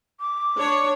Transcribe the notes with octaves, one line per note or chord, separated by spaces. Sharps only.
D6
D4 C#5